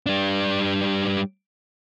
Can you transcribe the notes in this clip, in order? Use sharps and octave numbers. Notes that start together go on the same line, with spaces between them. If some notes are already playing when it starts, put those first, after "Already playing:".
G3 D4